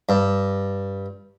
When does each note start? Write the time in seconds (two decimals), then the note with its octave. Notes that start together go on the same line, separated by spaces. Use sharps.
0.09 G2